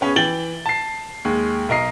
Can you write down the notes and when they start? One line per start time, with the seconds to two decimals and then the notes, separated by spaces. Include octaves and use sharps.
0.01 B3 C#4 G#4
0.16 E3 G5 A6 F#7 G7
0.66 A5 C7
1.25 D#2 G#3
1.69 B1 A#4 D#5 C7